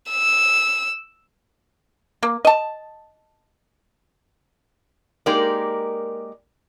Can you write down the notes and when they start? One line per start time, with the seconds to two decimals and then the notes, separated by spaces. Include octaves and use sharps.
0.10 E6
2.23 A#3
2.45 D#5 A5
5.26 G#3 A#3 D#4 G4 A#4 D5